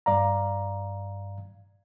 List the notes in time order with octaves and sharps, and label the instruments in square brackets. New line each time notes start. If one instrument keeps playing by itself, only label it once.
[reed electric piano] G2 D5 F5 A#5